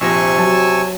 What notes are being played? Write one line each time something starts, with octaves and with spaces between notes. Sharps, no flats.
A#1 C3 F3 G#5 C#6 E6 A#6
F#3 A5